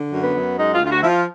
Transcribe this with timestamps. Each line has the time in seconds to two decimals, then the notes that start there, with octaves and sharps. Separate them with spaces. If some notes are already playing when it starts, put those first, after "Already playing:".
Already playing: D3
0.12 F#2
0.23 B3
0.35 F#2
0.57 G#3 D#4
0.75 F4
0.80 D2
0.85 F4
0.91 F#4
1.03 F3 E4
1.08 F4